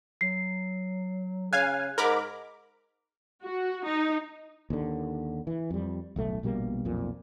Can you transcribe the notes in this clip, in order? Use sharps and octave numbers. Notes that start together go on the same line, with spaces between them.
F#3 C7
C#3 F5 G#5 F#6 G#6
G#2 A#4 B5 D6
F#4
D#4
D#2 D3
E3
F2 G3
D1 B1 A3
A#1 B2 G3 A#3
B1 F2 A#2